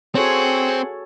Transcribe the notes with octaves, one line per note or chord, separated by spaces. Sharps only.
C4 F#4 G#4 A4 C5 C#5 F#5